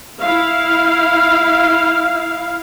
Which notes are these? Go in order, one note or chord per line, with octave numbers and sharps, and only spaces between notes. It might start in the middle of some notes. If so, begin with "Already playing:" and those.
E4 F5